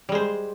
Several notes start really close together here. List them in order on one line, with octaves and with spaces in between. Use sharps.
G3 G#3 C5